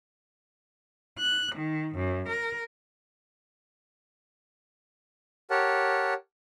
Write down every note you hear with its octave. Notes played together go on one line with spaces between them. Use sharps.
F#6
D#3
F#2
A#4
G4 A#4 C#5 F#5 A5